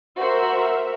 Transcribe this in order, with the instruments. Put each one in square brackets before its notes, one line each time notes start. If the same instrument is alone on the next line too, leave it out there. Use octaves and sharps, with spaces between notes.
[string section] F#4 C5 [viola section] A#4 E5